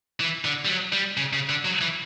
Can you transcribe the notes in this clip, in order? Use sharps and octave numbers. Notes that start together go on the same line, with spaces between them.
E3
D3
G3
F#3
G3
C#3
C#3
D3
F#3
E3